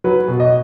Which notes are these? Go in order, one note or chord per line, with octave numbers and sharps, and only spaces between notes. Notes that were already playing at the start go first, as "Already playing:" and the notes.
F#3 B4
B2
D#5